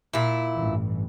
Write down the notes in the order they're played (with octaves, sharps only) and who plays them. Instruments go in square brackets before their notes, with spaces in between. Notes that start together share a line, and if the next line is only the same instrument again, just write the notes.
[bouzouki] A#2 E4
[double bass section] A1 G2 E3